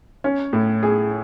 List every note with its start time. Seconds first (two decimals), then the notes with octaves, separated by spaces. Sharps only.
0.24 C#4
0.53 A2
0.83 G#4